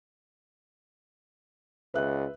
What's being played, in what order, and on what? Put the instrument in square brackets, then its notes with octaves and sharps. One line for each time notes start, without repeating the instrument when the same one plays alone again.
[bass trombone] C#2 [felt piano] B4 E5 F#6